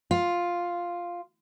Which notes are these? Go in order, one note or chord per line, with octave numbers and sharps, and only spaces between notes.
F4